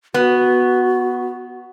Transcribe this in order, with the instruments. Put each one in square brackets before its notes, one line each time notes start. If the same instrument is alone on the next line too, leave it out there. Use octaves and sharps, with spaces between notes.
[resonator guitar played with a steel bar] B3 [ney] F#4